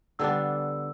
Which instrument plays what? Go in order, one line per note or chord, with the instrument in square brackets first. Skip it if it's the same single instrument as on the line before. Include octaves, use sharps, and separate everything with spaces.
[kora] D3 G3 B3 D4 [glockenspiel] E6